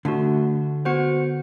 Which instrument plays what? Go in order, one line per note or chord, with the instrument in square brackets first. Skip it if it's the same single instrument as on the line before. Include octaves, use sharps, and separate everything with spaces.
[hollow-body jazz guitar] D3 [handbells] A3 D4 F#4
[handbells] B3 F#4 C5 F#5